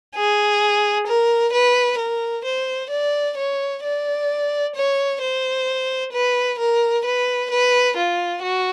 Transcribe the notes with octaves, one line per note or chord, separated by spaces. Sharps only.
G#4
A#4
B4
A#4
C5
D5
C#5
D5
C#5
C5
B4
A#4
B4
B4
F4
F#4